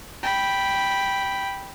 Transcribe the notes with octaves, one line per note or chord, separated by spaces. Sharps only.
G5 B5